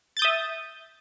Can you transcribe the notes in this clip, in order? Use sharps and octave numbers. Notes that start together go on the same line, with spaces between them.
E5 D#6 G6 A6